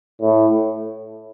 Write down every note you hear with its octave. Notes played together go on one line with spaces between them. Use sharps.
A2